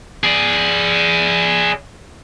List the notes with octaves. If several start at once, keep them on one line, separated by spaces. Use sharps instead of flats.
G#4 D5